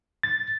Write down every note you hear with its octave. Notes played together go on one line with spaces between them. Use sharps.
A6